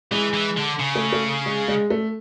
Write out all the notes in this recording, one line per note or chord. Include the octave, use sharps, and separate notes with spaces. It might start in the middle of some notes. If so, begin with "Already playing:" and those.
E3 G#3
E3
D3
C#3
A3
A3
G#3
G#3
A3